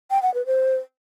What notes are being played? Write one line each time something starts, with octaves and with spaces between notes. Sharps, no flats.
G5
F#5
B4
C5